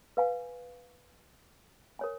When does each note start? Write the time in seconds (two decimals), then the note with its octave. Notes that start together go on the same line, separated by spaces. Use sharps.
0.17 B4 F5 G#5
1.99 A#4 C#5 G#5